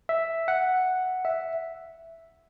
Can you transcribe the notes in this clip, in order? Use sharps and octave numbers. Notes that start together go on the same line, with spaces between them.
E5
F#5
E5